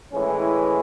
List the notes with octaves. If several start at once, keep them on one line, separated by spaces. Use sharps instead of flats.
A2 E3 G#3 C#4